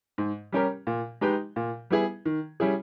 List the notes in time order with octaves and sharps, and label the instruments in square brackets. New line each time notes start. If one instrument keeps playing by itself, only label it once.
[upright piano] G#2
G3 C#4 G4 A#4
A#2
G#3 D#4 G4 B4
A#2
G3 B3 E4 G#4
D#3
G3 C#4 E4 G#4